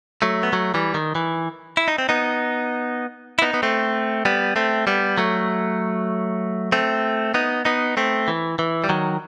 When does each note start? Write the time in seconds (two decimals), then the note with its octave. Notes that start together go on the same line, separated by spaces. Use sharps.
0.22 F#3 A3
0.43 B3
0.53 F#3 A3
0.74 E3 G3
0.94 D#3
1.15 E3
1.77 E4
1.88 D#4
1.98 C4
2.09 B3 D#4
3.39 E4
3.42 B3 D#4
3.54 B3
3.63 A3 C4
4.25 G3 B3
4.56 A3 C4
4.87 G3 B3
5.18 F#3 A3
6.72 A3 C4
7.34 B3 D#4
7.65 B3 D#4
7.97 A3 C4
8.28 E3
8.59 E3
8.84 G3
8.89 D#3 F#3